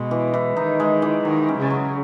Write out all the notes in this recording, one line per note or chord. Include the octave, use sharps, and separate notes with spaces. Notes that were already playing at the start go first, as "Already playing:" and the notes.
Already playing: B2 G#3
E3
E3
D#3 D#4
G#3
E3
D#3 F#3
C#4
C#3
F#3